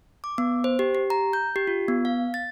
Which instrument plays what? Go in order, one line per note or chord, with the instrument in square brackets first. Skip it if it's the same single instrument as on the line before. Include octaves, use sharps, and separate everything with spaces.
[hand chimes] D6
B3
C5
G4
G4
A#5
G6
G4
F4
B3
F5
A6